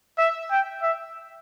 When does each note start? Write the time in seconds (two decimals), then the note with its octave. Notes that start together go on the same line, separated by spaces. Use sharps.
0.18 E5
0.51 G5
0.82 E5